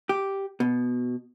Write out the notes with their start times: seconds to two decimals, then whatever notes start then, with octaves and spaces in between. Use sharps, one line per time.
0.09 G4
0.60 B2